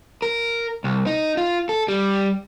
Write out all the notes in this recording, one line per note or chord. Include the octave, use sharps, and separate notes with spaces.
A#4
C2
D#4
F4
A4
G3